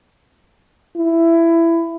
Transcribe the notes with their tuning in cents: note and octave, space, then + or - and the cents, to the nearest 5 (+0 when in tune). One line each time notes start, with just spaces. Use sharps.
E4 +15